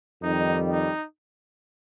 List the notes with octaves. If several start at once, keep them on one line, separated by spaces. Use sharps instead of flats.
F2 D#3 G3 D#4
D#4